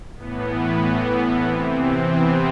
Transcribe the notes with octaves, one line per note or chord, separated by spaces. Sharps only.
A2 E3 B3
C3 E3 C4
C4
B3